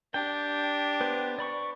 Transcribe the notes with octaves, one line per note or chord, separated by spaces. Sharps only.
D4 G4 G5
B3 B4 C5
D5 B5 C#6